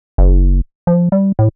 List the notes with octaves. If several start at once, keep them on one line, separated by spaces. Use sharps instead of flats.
F#1
F3
G3
A2